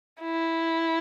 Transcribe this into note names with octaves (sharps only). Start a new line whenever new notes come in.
E4